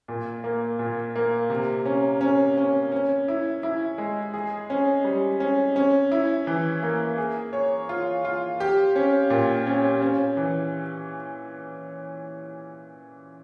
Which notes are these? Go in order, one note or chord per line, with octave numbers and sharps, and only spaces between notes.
A#2
A#3
A#2
A#3
C3
C#4
C#4
C#4
C#4
E4
E4
G#3
G#4
C#4
G3
C#4
C#4
E4
E3
A#3
G#4
C#5
F4
F4
G4
C#4
A#2
C#4
C#4
E3